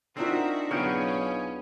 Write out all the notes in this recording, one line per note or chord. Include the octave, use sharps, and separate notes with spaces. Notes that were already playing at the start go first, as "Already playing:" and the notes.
C4 D4 D#4 F4 F#4 A#4 E5
B1 B2 B3 C#4 G#4 C#5 F5 G5